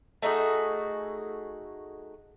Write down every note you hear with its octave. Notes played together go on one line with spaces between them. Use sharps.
A3 D#4 F#4 G#4